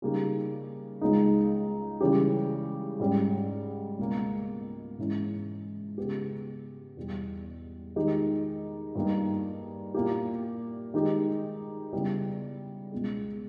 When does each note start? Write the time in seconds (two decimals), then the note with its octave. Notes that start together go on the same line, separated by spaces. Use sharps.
0.02 C#3 G3 A#3 D#4 G4
1.01 C#2 C#3 G#3 D#4
2.01 C#3 E3 G3 C#4 G4
3.00 G#2 G3 C#4
3.99 C#2 B2 A#3
4.98 G#2 E3 G#3 C#4 E4
5.98 C#3 G#3 B3 G4
6.97 E2 B2 G3
7.96 D#3 G#3 D#4 G4
8.95 G2 G3 A#3 D#4
9.94 A#2 A#3 E4 G4
10.94 D#3 G#3 D#4 G4
11.93 C#3 G3 B3 E4
12.92 C#2 B2 G#3